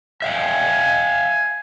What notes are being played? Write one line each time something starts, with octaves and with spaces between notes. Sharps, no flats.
E5 F5 G5 G#5